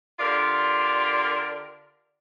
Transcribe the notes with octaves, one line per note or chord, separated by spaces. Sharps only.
D3 F4 G4 A#4 D5